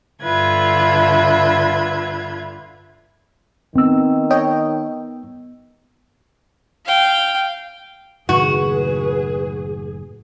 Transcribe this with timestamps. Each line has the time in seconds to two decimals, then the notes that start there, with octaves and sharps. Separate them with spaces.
0.23 G2 D3 F4 B4 E5 G#6
3.75 D#3 B3 C4 E6
4.31 C#5 D#5 G5
6.86 F5 G5
8.29 F#1 A2 D#3 F#4 G#4 B4